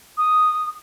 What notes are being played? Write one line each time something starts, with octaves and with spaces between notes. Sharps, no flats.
D#6